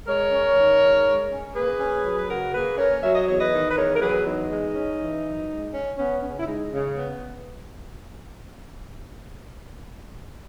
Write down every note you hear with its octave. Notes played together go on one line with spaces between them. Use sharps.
G#3 A#4 C#5
C#4
D#3
G#2
G#3
C#4
A#3 G#4 B4
C#4
F#3
B4
C#3 F#4 A#4
A#3 G#4 B4
C#4 A#4 C#5
F#3 E5
D#5
E2 C#5
B4 D#5
D#3
B4
E2 A#4 C#5
A#4
F#3 G#4 B4
E2 D#4
G#3
C#4
E3
F#2
G#3
C#4
B3 C#4
C#3 C#4
E4
G#3 D#4
C#3
B3